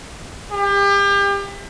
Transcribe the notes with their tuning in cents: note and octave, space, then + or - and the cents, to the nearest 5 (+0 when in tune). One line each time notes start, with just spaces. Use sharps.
G4 +35